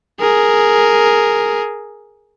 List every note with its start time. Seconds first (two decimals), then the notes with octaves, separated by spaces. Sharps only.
0.20 G#4 A#4